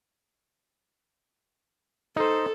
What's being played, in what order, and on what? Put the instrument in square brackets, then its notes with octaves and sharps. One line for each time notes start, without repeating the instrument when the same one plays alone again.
[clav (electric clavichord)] D#4 C5 [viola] A4